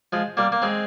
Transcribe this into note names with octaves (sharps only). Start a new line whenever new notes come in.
F3 G#3
G3 A#3
A#3
G#3 C4